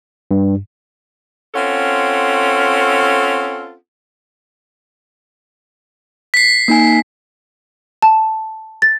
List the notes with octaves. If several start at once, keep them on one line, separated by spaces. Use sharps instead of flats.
G2
C4 C#4 F4 A4 F#5
B6 C7
A#3 D#4 G#5
A5
A6